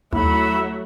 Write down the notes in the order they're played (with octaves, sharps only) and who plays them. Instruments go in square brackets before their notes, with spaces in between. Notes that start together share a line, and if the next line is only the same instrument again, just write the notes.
[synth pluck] D#2 [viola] F#3 A3 [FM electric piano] E4 [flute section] E5 F#5 B5